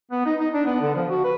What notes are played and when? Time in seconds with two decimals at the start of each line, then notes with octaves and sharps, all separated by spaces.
0.11 B3
0.26 D#4
0.40 D#4
0.54 D4
0.66 B3
0.81 D3
0.95 F3
1.09 F#4
1.24 B4